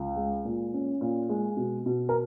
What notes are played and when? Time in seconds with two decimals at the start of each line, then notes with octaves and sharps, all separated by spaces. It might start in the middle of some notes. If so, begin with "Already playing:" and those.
Already playing: C#2
0.16 G#3
0.45 A#2
0.74 C#4
1.01 A#2
1.29 G#3
1.57 B2
1.86 B2
2.09 A#4